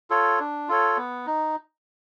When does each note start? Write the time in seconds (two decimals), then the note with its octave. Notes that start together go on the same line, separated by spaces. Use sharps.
0.10 F4 A4 C#5
0.40 D4
0.69 F4 A4 C#5
0.97 B3
1.27 D#4